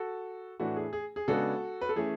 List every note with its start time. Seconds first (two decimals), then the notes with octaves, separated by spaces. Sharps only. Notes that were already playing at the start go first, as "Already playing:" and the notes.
Already playing: F#4 A4
0.60 A2 E3 A3 D4 F#4
0.76 G#4
0.93 G#4
1.16 G#4
1.28 C#3 G#3 B3 D4 F#4 A4
1.81 B4
1.89 A4
1.96 E3 A3 C#4 G#4